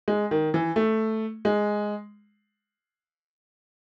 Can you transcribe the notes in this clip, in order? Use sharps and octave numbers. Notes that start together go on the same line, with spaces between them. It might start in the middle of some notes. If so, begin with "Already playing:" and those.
G#3
D#3
E3
A3
G#3